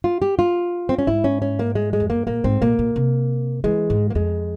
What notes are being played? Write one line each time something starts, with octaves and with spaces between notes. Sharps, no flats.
F4
G4
F4
C4
C#4
G#2 E4
C#4
C#4
A#3
G#3
G#3
F2
G2 A#3
A#2 A#3
G#2 C4
A#2 A#3
A#2
C3
E3 G#3
G#2
A#3
F2 G#3